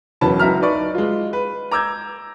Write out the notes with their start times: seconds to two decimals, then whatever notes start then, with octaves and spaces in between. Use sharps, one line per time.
0.21 E1 E3 F#3 C#4 A5 B5
0.39 C#2 F#3 E4 E5 A#5 F6
0.61 D#4 B4 D5 C#6
0.95 G#3 F4
1.33 B4
1.72 A#5 D6 E6 G6 G#6